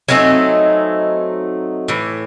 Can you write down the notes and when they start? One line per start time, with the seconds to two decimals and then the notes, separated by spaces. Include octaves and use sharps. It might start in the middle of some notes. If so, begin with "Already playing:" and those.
0.08 F#3 A3 C4 D#4 G#5
1.88 A2 E3